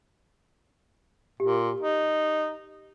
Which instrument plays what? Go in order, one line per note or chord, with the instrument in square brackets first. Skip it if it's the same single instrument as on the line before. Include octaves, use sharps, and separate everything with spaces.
[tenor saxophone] A#2 [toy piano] G4
[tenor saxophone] D#4